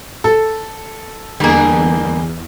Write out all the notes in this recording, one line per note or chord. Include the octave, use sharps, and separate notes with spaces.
A4
E2 D3 G3 A#3 G#4